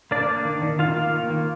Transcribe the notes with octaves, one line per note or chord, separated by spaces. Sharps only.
A#3 D4 D5
A#3
D#3
D#3
D#3 F4 F5
A#3
D#3
A#3